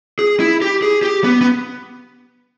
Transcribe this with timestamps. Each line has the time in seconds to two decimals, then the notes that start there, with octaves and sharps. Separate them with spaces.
0.19 G#4
0.40 E4
0.62 G4
0.82 G#4
1.03 G4
1.24 B3
1.41 B3